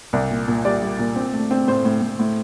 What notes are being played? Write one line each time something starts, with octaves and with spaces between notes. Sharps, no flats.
C2 D5
A#2
A#2
G3 D5
G3
A#2
C4
A3
C4
A2 C5
A2
A2
A2